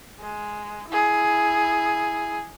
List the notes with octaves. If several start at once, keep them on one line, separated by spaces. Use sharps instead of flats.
G#3
E4 G#4